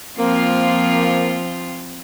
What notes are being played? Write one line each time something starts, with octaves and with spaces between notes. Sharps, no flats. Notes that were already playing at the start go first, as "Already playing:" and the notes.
F3 A#3 C4 F4